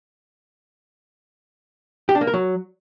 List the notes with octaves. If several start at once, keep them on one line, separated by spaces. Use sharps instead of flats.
G4
D4
A#3
A#4
F#3